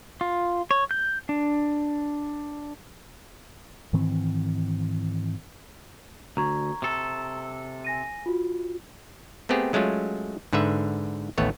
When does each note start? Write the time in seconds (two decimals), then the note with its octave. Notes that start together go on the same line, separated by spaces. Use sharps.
0.21 F4
0.71 C#5
0.91 G6
1.29 D4
3.93 G#2 D#3 E3 C4
6.37 D2 A#5 C#6 G#6
6.82 C3 A4
7.85 G#5 A#6 D#7
8.26 F4 F#4
9.49 A3 B3 C4 G4 G#4
9.73 F#3 G#3 A3 C#4 F4
10.53 G#2 D3 B4 E5
11.38 A1 D#2 A3 B3 C#5